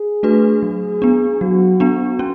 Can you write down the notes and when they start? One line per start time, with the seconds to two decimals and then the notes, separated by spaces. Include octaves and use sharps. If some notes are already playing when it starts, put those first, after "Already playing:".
Already playing: G#4
0.23 A3 D4 F#4 B4
0.62 F#3 G#4
1.02 B3 D4
1.41 F#3 F#4
1.80 B3 D4
2.19 C#4